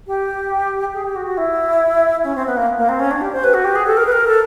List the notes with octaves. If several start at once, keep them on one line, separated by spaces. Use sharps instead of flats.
G4
G#4
G4
F#4
F#4
E4
C#4
C4
B3
A#3
A#3
C4
C#4
D4
G4
C5
B4
F#4
G4
G#4
A4
A#4
B4
A#4
A4